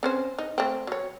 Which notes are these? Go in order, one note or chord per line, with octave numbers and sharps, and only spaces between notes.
C4 C#4 C5
D#4
A3 C4
F#3 C#5